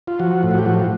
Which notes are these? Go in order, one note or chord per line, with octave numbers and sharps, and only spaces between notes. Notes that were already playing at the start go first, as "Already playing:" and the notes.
F4
F3 F#4
A2
F#4
G4
F3 F#4